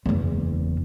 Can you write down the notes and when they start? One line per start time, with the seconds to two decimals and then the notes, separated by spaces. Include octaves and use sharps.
0.06 F#1 E2